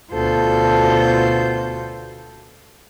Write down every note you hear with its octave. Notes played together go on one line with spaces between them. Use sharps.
D2 B2 F4 A4 C5 G6